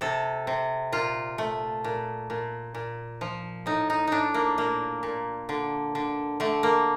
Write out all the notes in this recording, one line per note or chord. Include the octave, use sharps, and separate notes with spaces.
C3 A4
C3
A#2 F4
A3
A#2
A#2
A#2
F3
A2 D#4
D#4
A2 D4 D#4
A#3
A#2 A#3
A#2
D3
D3
D3 A3
A#3